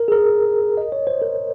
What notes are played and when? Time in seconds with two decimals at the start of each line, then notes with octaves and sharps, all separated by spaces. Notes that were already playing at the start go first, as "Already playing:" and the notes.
Already playing: A#4
0.08 G#4
0.12 A#4
0.77 D#5
0.92 C#5
1.07 C5
1.22 A#4